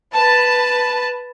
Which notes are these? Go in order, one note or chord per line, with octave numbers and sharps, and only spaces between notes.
B4 A5